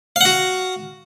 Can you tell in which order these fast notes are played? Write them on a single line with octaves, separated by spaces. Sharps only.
F5 F#5 F#4